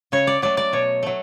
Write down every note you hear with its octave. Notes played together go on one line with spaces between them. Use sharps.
C#3 C#5
D5
F#3 A3 D5
D5
B2 C#5
F#3 A3